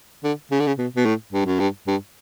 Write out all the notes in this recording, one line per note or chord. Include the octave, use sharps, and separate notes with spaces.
D3
C#3
D3
C#3
B2
B2
A2
G2
F#2
G2
G2